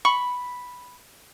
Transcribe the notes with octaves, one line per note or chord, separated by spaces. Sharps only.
B5 C#6